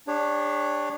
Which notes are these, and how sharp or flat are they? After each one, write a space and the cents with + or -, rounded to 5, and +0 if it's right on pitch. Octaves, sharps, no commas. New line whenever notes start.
D4 +10 G4 +45 C#5 -5